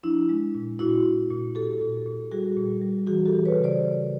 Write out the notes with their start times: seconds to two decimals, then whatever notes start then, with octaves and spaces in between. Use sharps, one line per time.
0.03 F3 D4 E4
0.29 G#3
0.55 A#2
0.79 A#2 E4 F#4
1.04 A#2
1.31 A#2
1.55 A#2 G4 A4
1.81 A#2
2.06 A#2
2.32 G3 F#4 G#4
2.57 A#2
2.82 G3
3.07 E3 F#4 G#4
3.26 G4 A4
3.32 E3
3.45 B4 C#5
3.58 C#3
3.64 C5 D5